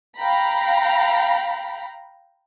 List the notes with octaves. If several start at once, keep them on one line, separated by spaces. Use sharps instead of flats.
F5 G5 A#5 B5